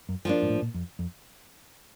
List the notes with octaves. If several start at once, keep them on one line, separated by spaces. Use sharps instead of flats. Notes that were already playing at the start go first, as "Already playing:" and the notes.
F#2
G2 F3 A#3 D4
G#2
A2
A#2
F2
F2